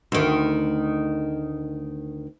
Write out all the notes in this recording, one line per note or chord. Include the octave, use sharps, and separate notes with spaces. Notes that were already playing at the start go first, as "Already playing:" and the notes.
D2 D#3